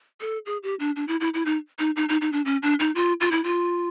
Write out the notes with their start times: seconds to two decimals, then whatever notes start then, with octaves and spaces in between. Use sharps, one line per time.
0.21 A4
0.46 G#4
0.63 G4
0.80 D4
0.96 D4
1.08 E4
1.20 E4
1.34 E4
1.46 D#4
1.79 D#4
1.96 D#4
2.09 D#4
2.21 D#4
2.33 D4
2.45 C#4
2.63 D4
2.80 D#4
2.95 F4
3.21 F4
3.31 E4
3.44 F4